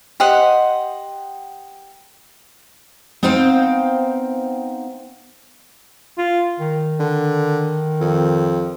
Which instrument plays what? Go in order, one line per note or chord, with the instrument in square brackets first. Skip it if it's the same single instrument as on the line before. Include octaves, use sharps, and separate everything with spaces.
[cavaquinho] G4 C5 D#5 F#5
[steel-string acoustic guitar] B3 C4 D#4 C5 F5 G5
[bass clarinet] F4
D#3
[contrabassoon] D3
F2